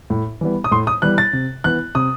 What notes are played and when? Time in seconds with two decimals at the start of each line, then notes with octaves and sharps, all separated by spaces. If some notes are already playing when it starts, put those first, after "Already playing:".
0.10 A2
0.41 E3 G3 B3
0.64 D#6
0.71 A2 C6
0.87 D#6
1.02 E3 G3 B3 F#6
1.18 A6
1.33 C3
1.64 E3 B3 F#6
1.95 C3 D#6